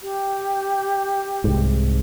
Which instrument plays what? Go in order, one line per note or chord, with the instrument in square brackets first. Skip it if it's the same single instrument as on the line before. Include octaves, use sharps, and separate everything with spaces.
[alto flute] G4
[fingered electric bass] C2 G#2